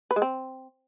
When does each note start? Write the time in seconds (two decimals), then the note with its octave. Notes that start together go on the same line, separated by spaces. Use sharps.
0.11 B4
0.16 G#3
0.22 C4